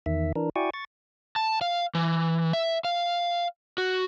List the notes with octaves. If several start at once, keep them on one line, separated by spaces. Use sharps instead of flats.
E2 D#3 E5
E3 D4 A#4
E4 F#4 D5 G5 G#5 C#6
C#6 A6
A5
F5
E3
E5
F5
F#4